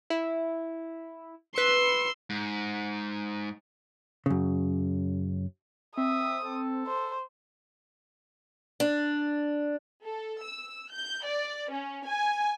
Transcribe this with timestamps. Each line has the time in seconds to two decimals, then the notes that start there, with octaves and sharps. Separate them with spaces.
0.10 E4
1.56 B4 C6 E6 C#7
2.30 G#2
4.26 F#2 C#3
5.97 C4 E5 D#6
6.44 A4
6.87 C5
8.80 D4
10.03 A4
10.42 E6
10.91 G6
11.26 D5
11.71 C#4
12.06 G#5